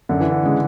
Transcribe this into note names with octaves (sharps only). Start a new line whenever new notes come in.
F#2 D3
E3
D3
C#3 G#3